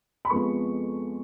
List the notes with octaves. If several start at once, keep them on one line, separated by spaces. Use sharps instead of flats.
B5
F2 F3 G#3 B3 C#6